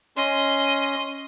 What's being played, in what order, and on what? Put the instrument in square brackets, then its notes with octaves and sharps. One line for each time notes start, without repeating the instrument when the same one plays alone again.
[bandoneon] C#4 C6 [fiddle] D#5